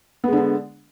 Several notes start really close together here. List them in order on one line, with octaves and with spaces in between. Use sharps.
B3 G#3 D3 D4